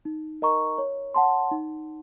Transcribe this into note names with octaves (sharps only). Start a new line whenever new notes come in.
D#4
A#4 D#5 A#5 C#6
C#5
F#5 A5 C6
D#4